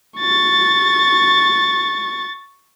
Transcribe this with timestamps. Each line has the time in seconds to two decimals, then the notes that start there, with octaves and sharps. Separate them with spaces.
0.19 C#6 A6